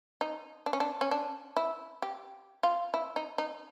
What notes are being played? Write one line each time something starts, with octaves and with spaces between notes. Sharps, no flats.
D#4
D4
C#4
D4
C#4
D4
E4
G4
F4
E4
D#4
D#4